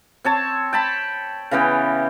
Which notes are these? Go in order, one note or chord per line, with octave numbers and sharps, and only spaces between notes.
C4 C#5 A5
G5 A5 B5
C#3 E3 B3 G5